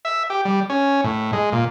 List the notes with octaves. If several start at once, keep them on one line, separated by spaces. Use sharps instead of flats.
E5
G4
G3
C#4
A2
G#3
A#2